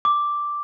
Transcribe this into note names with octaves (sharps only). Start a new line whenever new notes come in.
D6